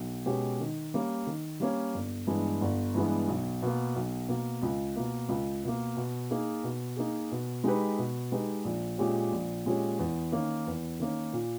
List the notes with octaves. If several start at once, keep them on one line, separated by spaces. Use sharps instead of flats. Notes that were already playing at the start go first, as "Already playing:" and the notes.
Already playing: B1
B2 G#3 C#4 G4
D#3
G3 A#3 C#4
D#3
G3 A#3 C#4
G1
G2 E3 G#3 B3
G1
G2 E3 G#3 B3
B1
B2 A#3
B1
B2 A#3
C#2
B2 A#3
C#2
B2 A#3
B2
A#3 D#4 G#4
B2
A#3 D#4 G#4
B2
G#3 D#4 G4 B4
B2
G#3 D#4 G4 B4
A#1
A#2 G#3 C#4 G4
A#1
A#2 G#3 C#4 G4
E2
D#3 A#3 C#4
E2
D#3 A#3 C#4
A#2